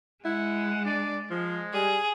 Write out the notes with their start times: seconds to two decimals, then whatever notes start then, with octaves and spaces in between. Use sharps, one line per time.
0.25 G#3 E4 F#5
0.85 D4 D5
1.31 F3 G#3
1.74 G3 G#4